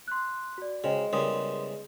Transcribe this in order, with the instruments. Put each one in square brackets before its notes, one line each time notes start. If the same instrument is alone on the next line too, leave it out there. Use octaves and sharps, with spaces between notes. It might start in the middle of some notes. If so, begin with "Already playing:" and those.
[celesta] C6 F#6
F#4 D5
[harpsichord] C#3 [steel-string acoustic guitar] G#3 [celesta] F#4 C5 G5
[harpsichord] E2 C#3 G3 [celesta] A#4 C6 D#6